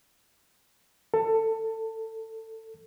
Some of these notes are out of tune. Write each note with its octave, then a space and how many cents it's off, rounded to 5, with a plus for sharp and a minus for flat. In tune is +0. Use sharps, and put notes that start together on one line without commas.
A4 +20